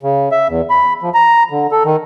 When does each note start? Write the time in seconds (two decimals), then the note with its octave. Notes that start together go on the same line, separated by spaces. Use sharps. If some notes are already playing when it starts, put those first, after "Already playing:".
0.03 C#3
0.32 E5
0.49 E2
0.70 B5
1.03 F3
1.14 A#5
1.51 D3
1.72 A4
1.85 D#3